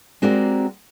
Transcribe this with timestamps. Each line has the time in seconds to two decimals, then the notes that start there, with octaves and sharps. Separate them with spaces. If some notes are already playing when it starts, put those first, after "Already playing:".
0.22 G#3 C4 F#4 G4 A#4 D5